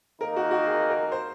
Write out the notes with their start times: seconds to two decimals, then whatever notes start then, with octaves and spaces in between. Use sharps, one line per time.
0.21 D#3 A#3 D#4 A#4
0.36 F#4
0.51 F#4
0.66 G#4
0.90 A#4
1.12 C5